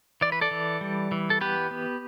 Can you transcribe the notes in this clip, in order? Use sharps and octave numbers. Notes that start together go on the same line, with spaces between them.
E3 D5
B4
A4 D5
E3
G3
E3
A4
B3 G4 B4
B3